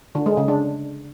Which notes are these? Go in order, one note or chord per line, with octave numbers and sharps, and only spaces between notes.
D3
G#3
C#3
D4